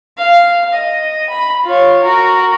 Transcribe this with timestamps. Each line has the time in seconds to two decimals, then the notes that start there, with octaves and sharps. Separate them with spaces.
0.18 F5
0.74 D#5
1.30 B5
1.64 F4 C#5
2.03 F#4 A#4